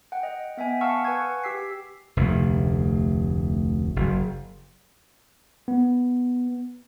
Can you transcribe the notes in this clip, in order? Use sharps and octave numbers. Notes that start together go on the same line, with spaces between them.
F#5 G5
D#5
B3 E5 G5 G#5
F5 F#5 A5 C#6 E6 F6
B4 F#5 G#5 C#6 G#6
G4 G5 E6 B6 C7
F1 D2
F#1
B3